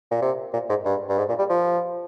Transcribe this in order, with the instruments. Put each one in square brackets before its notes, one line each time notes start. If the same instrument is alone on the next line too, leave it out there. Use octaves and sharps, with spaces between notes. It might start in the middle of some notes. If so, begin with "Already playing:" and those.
[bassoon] A#2
C3
A#2
G#2
G2
G2
G#2
A#2
G3
F3